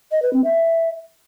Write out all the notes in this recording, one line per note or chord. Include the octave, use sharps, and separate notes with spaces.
D#5
B4
C4
E5